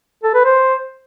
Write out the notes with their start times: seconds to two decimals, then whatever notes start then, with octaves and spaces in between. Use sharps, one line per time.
0.23 A4
0.34 B4
0.45 C5